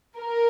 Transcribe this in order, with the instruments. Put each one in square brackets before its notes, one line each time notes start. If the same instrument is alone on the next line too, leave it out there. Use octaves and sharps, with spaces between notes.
[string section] A#4